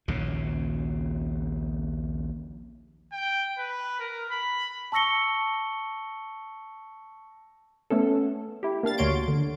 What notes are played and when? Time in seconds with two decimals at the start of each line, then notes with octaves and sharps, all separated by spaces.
0.08 A#1 D#2 C#3
3.12 G5
3.58 B4
4.00 A#4
4.31 B5
4.92 A5 C#6 E6 A#6 C#7 G7
7.90 A3 B3 C#4 A4
8.63 E4 G4
8.83 A#3 D4 F5 A6
8.98 D2 F#4 C#5 C6 D7
9.28 D3